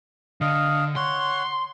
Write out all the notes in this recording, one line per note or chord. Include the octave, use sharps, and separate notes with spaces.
D3 D#5 F5
C#5 F#5 C6